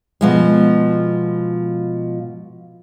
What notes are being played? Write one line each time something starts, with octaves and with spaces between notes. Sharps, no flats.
B2 F3 G#3